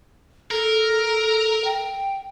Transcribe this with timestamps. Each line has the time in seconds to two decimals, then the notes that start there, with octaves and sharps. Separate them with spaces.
0.51 A4 A#4
1.64 G5